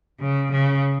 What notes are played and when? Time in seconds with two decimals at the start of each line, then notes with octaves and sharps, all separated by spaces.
0.20 C#3
0.51 C#3